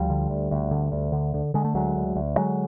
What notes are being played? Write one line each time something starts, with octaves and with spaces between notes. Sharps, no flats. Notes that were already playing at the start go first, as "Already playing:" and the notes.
Already playing: D2 F3 G3
D3
D2
D2
D3
D2
D3
D3
D3 G#3
A3
D2 F#3 G#3
D2
D2
D3 F#3 G#3